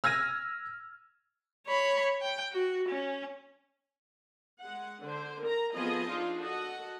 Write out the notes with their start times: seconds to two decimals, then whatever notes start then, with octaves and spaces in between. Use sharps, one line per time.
0.04 E6 F6 G#6 A#6 D#7
1.67 C#5 B5
2.22 G5
2.52 F#4
2.89 C#4
4.60 G#3 F#5
5.02 D3 C5
5.43 A#4 A#5
5.75 F3 B3 C4 G#4 A4 D#5
6.10 D4 D#4 F4 G#4
6.40 F#4 A4 D#5 F#5